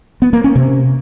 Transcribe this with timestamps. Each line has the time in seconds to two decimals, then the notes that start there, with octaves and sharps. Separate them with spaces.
0.22 B3
0.33 A#3
0.44 C#4
0.55 C3